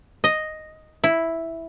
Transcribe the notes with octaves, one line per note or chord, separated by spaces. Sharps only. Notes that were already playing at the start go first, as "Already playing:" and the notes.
D#5
E4